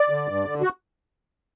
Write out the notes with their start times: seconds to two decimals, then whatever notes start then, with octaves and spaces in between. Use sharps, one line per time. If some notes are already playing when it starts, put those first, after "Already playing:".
Already playing: D5
0.10 D3
0.27 G2
0.45 D3
0.61 F#4